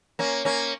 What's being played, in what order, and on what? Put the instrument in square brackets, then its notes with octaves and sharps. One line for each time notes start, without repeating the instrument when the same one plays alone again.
[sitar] A#3 C#4
A#3 C#4